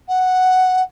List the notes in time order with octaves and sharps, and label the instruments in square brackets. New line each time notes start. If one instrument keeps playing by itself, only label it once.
[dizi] F#5